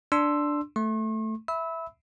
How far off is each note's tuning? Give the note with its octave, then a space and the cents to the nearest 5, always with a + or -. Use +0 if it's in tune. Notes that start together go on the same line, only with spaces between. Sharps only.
D4 +0 C6 +0 E6 +10
A3 +0 C#6 -45
E5 +0 B5 +5 E6 -25